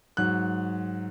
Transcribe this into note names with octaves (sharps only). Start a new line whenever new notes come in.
G#2 F#3 F#6